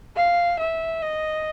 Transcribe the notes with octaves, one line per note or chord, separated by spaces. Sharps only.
F5
E5
D#5